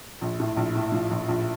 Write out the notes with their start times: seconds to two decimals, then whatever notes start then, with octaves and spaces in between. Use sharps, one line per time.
0.21 A#1
0.40 A2
0.57 A#1
0.75 A2
0.92 F3
1.11 A#1
1.28 A#1